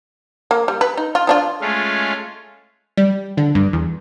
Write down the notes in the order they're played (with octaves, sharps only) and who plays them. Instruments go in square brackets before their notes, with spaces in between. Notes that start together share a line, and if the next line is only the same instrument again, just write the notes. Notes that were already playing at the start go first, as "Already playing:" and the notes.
[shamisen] A#3
G3
B4
D#4
F4
F3 D4 F4
[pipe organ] G#3 A3 C#4 F4
[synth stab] G3
D3
G2
E2